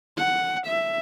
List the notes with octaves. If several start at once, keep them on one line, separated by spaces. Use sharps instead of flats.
F#5
E5